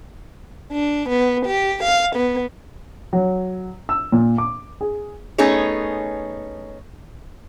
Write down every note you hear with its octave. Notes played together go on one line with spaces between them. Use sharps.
D4
B3
G4
F5
B3
F#3
E6
A#2
D6
G#4
A3 B3 C#4 D#4 G#4 C#5